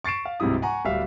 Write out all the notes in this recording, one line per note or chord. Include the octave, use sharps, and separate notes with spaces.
C#6 A6 C7 D7 E7
F5
D1 G#2 C3 G3 E4 D#6
F#5 G#5 A#5 C#6
D1 G3 E5 F5